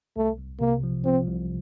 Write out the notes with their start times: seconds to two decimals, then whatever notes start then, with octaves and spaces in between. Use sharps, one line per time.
0.17 C2 A3
0.38 C2
0.60 C3 A#3
0.83 F3
1.05 F3 C4
1.27 C2